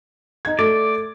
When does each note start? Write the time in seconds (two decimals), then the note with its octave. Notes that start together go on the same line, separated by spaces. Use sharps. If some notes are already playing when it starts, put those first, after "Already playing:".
0.45 D#4 G#6
0.59 A3 D5